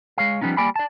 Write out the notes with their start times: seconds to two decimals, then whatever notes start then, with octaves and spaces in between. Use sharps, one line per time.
0.18 G#3 C#5 F5
0.41 F3 G3 B3 C#4 D#4
0.57 G3 A#3 D5 G#5 B5
0.76 D5 A5